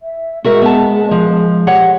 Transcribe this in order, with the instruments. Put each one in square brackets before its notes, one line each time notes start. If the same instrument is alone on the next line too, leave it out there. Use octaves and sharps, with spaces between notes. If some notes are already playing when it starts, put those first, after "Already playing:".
[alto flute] E5
[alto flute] G#3 [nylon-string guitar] F#4 A#4 E5
[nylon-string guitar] B3 A5
F3
G4 C#5 F#5